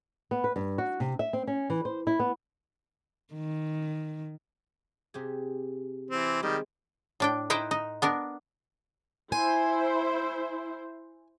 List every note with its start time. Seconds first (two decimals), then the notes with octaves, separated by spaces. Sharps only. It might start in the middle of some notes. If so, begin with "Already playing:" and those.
0.31 B3
0.44 B4
0.56 G2
0.78 F#4
1.00 C3
1.19 E5
1.33 C4
1.47 C#4
1.70 E3
1.85 C5
2.07 E4
2.19 B3
3.34 D#3
5.14 C3 G4 G#4
6.11 E3 C4
6.43 D#3 G3 G#3 C4
7.20 A2 D4 G5
7.50 D#4 E4 B4 C5 G5
7.71 D#4
8.02 B3 D4 A#4
9.32 E4 C5 G#5